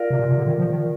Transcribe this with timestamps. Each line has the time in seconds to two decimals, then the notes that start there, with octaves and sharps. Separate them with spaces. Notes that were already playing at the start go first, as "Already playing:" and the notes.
Already playing: F4 A#4 D5 F5
0.10 C3
0.19 A#2
0.29 C3
0.38 D3
0.46 D#3
0.58 F3
0.70 D#3